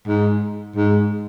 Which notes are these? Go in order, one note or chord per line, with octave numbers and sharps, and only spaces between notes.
G#2
G#2